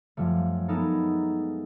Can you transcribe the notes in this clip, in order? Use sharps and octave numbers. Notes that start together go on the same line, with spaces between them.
F#2 F3 G3 A3
G#3 B3 D#4 A4 A#4